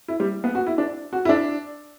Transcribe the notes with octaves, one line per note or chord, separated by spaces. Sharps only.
E4
G3
B3
F#4
E4
D4
F#4
E4
D4